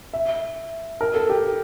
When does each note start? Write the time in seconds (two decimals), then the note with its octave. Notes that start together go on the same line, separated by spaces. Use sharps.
0.13 E5
1.01 A#4
1.14 A4
1.29 G4